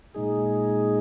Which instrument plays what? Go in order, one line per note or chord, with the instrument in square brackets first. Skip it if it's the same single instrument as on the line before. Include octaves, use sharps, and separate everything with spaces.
[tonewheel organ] A#2 G#3 D#4 G#4